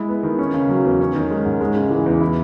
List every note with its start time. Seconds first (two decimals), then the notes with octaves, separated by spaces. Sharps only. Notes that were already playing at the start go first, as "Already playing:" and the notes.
Already playing: G#3 E4
0.09 B3
0.23 D#3
0.39 C#4
0.54 C#3
0.69 F#3
0.85 E2
1.00 C#4
1.15 D#3
1.31 G#3
1.45 G#2
1.61 G#3
1.76 C#3
1.91 E3
2.06 E2
2.21 E4